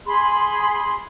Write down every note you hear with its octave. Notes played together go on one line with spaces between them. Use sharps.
G#4 B5 C6